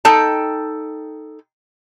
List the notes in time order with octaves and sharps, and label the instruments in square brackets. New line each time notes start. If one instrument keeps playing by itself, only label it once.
[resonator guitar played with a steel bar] D#4 A4 G5 A5